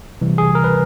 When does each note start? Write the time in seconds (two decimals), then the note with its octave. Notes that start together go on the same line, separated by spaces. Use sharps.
0.21 C3 E3 G3
0.38 G#4
0.55 A#4
0.64 B4